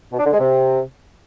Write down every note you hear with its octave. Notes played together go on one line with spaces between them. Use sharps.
B2
D4
D3
G#3
C3